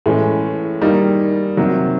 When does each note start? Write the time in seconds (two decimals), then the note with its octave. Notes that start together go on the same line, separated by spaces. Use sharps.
0.06 A2 E3 G#3 C#4
0.81 D#3 G3 A#3 D#4
1.57 C3 D#3 F#3